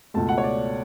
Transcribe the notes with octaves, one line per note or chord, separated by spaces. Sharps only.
C#2 B2 A3 A5
F#5
C#5
D5